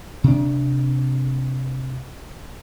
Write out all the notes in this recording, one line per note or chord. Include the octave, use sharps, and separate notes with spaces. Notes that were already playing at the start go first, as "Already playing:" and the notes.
C3 D4